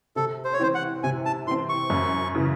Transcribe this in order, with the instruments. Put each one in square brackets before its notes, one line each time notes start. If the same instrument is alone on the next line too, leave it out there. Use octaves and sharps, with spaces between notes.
[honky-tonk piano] C3 [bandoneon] A4
[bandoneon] C5
C#5
[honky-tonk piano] E3 C4 [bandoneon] C5
[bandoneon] F#5
[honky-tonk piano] C3 [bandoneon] G#5
[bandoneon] A5
[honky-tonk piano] E3 [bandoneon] C6
[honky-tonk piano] C4
[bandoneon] C#6
[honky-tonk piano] F#2
C#3 E3